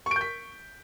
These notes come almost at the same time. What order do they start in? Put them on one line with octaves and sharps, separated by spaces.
C#6 D7 G6 B6